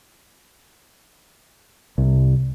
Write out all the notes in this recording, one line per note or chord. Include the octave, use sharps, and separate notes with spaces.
C2